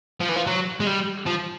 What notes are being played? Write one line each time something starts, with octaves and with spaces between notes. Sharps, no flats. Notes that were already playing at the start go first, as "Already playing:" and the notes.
F3
E3
F3
F#3
G#3
G3
F3